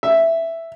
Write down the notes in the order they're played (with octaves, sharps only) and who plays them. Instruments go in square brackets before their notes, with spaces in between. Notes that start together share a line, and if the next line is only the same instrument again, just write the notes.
[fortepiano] E5